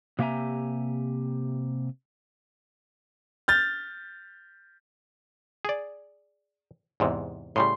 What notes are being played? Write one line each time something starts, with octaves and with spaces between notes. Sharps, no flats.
C3 A#3 G4 E5 G#5 A#5
F6 G6 A6
G#4 D5
E2 G#2 C3
A2 C#3 G3 C6